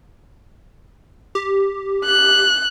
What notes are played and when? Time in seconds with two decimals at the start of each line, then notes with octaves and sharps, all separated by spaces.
1.35 G4
2.06 F#6